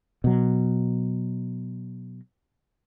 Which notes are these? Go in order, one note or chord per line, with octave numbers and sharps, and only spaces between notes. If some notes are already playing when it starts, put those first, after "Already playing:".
B2 F#3